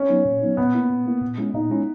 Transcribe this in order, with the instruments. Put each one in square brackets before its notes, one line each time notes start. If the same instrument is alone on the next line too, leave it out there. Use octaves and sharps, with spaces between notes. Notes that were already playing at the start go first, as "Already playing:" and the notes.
Already playing: [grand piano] C#4
[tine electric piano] F#3 B3 D#4
A#2
F#3 B3 D#4
[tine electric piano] A#2 [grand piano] B3
[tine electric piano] A#3 E4
A#2
A#3 E4
A#2
G#3 C#4 E4
[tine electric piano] A#2 [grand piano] D#4
[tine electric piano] G#3 C#4 E4